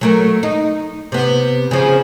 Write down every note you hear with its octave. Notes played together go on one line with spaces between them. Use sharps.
F#3 A3 A#4
D#4
C3 B3
C#3 F3